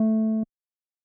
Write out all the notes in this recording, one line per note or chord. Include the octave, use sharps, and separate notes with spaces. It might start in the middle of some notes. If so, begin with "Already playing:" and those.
Already playing: A3